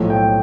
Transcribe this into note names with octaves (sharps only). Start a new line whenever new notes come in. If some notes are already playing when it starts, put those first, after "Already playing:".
Already playing: B1 A2 F3 A3
G5